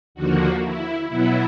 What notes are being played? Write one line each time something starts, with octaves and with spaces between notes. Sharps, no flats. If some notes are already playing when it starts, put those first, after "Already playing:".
D#2 D3 F3 A#3 F#4
E4
B2 F#3 B3 E4